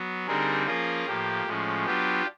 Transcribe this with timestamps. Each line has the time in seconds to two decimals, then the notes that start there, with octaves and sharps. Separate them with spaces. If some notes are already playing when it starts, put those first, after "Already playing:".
Already playing: F#3 B3
0.27 D3 G3 C4 D#4 G#4 A#4
0.66 F3 A#3 C#4 F4 G#4 A#4
1.07 A2 F3 A#3 G4
1.46 A2 F3 G#3 C#4
1.85 F#3 B3 D4 F4 G4